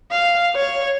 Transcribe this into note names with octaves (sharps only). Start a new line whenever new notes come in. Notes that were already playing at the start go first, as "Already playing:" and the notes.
F5
C#5